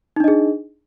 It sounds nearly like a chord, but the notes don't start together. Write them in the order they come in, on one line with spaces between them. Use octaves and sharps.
D#4 D4 D#5 G#4